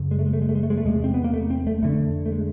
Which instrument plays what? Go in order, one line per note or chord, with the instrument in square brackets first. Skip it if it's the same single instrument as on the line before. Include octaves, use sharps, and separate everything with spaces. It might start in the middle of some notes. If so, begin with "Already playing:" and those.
Already playing: [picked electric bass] F#2 C#3
G#3
A3
G#3
A3
G#3
A3
G#3
A3
G#3
A3
E2 C3 G#3
C4
B3
A#3
A3
C4
A3
F2 D3 A3
A3
G#3